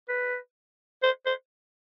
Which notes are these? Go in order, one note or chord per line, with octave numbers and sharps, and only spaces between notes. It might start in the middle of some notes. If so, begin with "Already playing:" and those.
B4
C5
C5